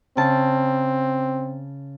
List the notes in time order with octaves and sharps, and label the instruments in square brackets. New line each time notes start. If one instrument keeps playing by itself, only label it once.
[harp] C#3 A5 [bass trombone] C4